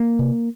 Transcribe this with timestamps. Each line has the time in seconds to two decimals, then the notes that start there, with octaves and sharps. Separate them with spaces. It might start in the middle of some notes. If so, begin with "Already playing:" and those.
Already playing: A#3
0.19 C3